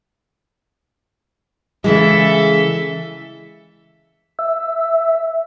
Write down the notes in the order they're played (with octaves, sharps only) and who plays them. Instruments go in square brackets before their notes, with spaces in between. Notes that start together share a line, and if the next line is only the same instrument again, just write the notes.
[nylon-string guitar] C#3 E3 G#3 [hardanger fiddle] A4 E5
[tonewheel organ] E5